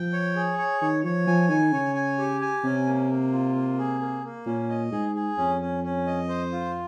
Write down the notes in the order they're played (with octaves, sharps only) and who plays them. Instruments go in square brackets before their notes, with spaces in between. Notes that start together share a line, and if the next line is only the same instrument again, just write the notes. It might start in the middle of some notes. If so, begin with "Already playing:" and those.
Already playing: [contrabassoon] F3 [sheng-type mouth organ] G5
[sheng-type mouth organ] C#5
G#4
C#5
[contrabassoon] D#3 [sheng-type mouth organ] C#5
[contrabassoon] F3 [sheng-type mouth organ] C#5
[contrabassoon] F3 [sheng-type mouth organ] G#5
[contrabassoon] D#3 [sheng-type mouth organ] G#5
[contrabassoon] C#3 [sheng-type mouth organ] C#5
[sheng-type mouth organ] G#5
G4
G#5
[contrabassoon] C3 [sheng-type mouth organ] C#4
[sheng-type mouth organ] A#3
A#3
F4
A#3
G#4
A#3
A#3
[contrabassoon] A#2 [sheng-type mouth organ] C#4
[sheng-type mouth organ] D#5
[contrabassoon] G#2 [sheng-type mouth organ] G#4
[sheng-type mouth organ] G#4
[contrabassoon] F2 [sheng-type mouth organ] C#4
[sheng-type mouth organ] C#4
C#4
D#5
C5
F4